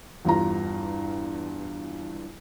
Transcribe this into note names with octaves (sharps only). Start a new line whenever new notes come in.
E2 G2 F4 A#5